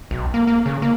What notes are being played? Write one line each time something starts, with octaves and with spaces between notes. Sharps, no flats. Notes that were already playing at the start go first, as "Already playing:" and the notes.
B1
A#3
A#3
C#3
A#3